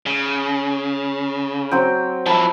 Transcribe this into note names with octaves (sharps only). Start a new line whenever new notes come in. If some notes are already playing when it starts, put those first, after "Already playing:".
C#3
F#3 C4 G5
F3 E4 A5 B5